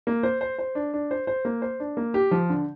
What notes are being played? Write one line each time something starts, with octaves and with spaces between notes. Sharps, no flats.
A#3
C5
C5
C5
D4
D4
C5
C5
A#3
C5
D4
A#3
G4
F3
D3